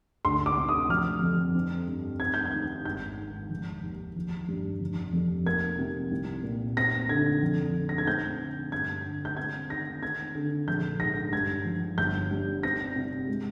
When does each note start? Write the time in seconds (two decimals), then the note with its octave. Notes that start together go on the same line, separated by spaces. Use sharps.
0.25 D2 C6
0.46 D6
0.57 C3
0.69 D#6
0.89 F3 F6
1.22 F2
1.55 C4
1.88 G2
2.20 C4 G#6
2.34 G6
2.46 G#6
2.53 D#3
2.85 G#1 G6
3.17 G#2
3.50 F1
3.83 D#2
4.16 F3
4.48 G2
4.80 F1
5.13 F2
5.46 A#3 G#6
5.79 C3
6.11 C2
6.43 A#2
6.77 C4 A#6
7.09 D3 G#6
7.42 F2
7.75 D3
7.89 A#6
7.98 G#6
8.07 C4 G6
8.40 D3
8.72 G2 G#6
9.05 D3
9.25 G6
9.37 C4 G#6
9.70 D#3 A#6
10.03 C4 G#6
10.35 D3
10.67 A#1 G6
11.00 G#2 A#6
11.32 G2 G#6
11.65 F3
11.98 G1 G6
12.31 G2
12.63 C4 A#6
12.96 C3
13.28 G#3